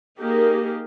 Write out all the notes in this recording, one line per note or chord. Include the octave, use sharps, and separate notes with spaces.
A#3 D#4 G4 G#4 A#4